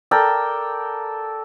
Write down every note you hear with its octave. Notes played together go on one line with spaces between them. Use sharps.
A4 A#4 D5 G5